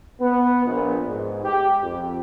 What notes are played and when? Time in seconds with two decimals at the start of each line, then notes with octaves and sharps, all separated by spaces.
0.21 B3
0.65 A#1
1.07 G#2
1.44 G4
1.83 F2